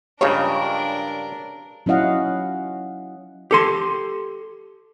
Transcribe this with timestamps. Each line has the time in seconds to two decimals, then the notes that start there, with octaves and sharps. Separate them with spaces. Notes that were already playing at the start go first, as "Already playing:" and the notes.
0.21 G2 C#3 F3 G#3 D4 A#4 C#5
1.86 F#3 C#4 E4 D#5 F5 F#5
3.51 G4 A4 C6